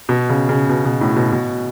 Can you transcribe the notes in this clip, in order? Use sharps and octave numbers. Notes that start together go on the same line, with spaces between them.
B2
C#3
C#3
B2
B2
A2
B2
B2